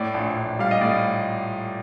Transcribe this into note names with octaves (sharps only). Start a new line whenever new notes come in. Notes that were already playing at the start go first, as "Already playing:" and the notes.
Already playing: A2 D5
A#1
A#1
G3 F5
D#5
A2 D5